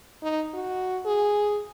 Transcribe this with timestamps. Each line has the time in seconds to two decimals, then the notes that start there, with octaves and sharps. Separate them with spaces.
0.23 D#4
0.54 F#4
1.05 G#4